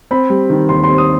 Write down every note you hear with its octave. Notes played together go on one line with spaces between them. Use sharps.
C4 B5
G3
D#3
D#2 C6
C6
C4
D#6